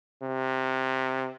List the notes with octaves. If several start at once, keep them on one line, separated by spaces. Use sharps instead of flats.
C3